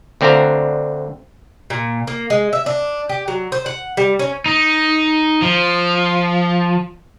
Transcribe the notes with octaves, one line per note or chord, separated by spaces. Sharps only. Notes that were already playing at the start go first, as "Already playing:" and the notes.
D2 D3 C4 D4 F5 A#5
A#2
A#3
G#3
E5
D4
G4
F#3
C5
F#5
G3
C#4
D#4
F3